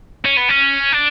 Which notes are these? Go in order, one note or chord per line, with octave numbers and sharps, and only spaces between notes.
C#4
B3
C#4
D4